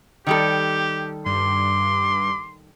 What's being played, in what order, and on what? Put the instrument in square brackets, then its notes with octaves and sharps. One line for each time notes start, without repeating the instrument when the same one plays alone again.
[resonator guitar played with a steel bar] D#3 G3 A4 [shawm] G4
[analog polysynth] G2 [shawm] C6 [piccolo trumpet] D6